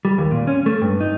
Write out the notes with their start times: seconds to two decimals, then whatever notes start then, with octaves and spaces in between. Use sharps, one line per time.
0.05 G3
0.18 D#2
0.31 A#2
0.47 C#4
0.66 A3
0.81 G2
1.00 D#4